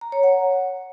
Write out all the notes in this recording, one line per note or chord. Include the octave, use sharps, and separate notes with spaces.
A#5
C#5
F#5